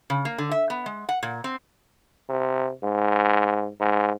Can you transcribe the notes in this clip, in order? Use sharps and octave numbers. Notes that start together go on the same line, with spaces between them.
C#3
A#3
D3
E5
B3
G#3
F#5
A#2
C4
C3
G#2
G#2